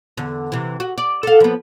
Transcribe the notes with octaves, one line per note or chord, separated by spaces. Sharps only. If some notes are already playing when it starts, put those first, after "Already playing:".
E2 D3
C3 E3
F#4
D5
A4 F5
F3 B3